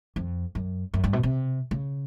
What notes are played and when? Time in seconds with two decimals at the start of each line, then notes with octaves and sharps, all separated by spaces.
0.16 F2
0.55 F#2
0.94 F#2
1.04 G2
1.13 B2
1.23 C3
1.71 C#3